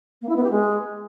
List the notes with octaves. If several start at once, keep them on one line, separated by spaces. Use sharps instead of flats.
A#3
E4
B3
G4
G#3